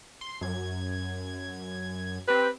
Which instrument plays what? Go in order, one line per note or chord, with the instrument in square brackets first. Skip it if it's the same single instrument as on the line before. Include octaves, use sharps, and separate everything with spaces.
[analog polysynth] C6
F#2 G#6
[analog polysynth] C4 G4 [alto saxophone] B4